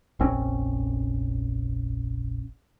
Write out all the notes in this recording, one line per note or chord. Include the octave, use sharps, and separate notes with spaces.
F1 A#1 C4 C#4